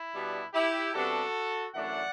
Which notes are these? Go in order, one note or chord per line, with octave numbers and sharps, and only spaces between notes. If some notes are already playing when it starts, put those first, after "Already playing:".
Already playing: E4
B2 G3 B3 D4
E4 G4
C3 G3 B3 D4 F#4 A4
F#2 E3 A3 D4 D5 F#5